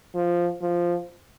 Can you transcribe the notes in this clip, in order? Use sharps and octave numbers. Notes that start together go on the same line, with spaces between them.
F3
F3